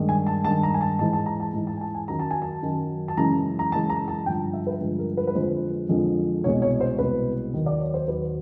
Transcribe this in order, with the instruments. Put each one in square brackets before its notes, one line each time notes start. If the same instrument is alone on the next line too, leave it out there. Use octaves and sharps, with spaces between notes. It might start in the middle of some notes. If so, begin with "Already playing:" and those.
Already playing: [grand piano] G2 D#3 G#3
G#5
A5
G#3 A5
G2 D#3
A#5
G#5
A5
G#2 E3 G#3 A5
A5
A#5
A5
G#2 E3 G#3
A5
G#5
A5
G#5
F#2 D#3 F#3 A#5
A5
G#5
A5
F#2 D#3 F#3
A5
F#2 C#3 E3 G#3 A#5
A#5
F#2 C#3 E3 G#3 A5
A#5
A5
G2 D3 F3 G#3 G5
E5
B4
G2 D3 F3 G#3
A#4
B4
B4
F2 D3 F3 G#3 C5
F2 D3 F3 G#3
C2 B2 G#3 C#5
C#5
C5
C2 B2 G#3 B4
D#2 D#3 F#3
D5
C#5
C5
D#2 D#3 F#3 B4